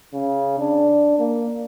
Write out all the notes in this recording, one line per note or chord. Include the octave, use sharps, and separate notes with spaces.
C#3
D4
A#3